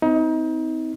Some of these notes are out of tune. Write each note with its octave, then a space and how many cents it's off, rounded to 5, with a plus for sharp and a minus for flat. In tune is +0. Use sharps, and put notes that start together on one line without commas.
C4 -30 D#4 +30